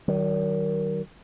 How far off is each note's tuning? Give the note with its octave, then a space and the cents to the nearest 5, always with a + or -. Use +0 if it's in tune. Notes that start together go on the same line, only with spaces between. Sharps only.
D#3 +0 F#3 +45